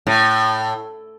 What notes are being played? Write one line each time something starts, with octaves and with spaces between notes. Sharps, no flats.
A2